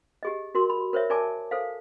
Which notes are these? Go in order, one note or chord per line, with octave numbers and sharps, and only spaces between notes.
G4 G#4 D#5
F#4 A#4 C6
B5
A#4 C5 C#5 E5
A#4 D5 G#5 A5 D6
A4 C5 F5